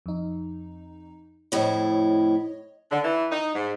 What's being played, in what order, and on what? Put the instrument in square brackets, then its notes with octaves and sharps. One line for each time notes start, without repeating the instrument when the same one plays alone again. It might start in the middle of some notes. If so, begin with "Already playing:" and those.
[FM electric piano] F2 D#4
[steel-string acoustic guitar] F2 A2 E4 [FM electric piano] C#5 D#5
[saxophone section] D3
E3
D#4
G#2